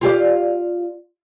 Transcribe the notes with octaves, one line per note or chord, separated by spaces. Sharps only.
F4 G4 D5